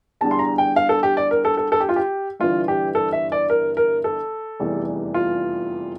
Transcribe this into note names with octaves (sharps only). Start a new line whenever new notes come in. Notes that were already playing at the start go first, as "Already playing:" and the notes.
E2 D3 G3 A5
C6
A#5
G5
F5
A4
G4
D5
A#4
A4
A4
A4
G4
F4
G4
G1 G2 E3 F4
G4
A4
E5
D5
A#4
A#4
A4
F1 E2 E3 G3
F4